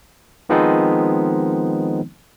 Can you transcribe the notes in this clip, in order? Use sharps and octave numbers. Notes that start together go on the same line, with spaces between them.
D#3 F3 G#3 B3 C4 D#4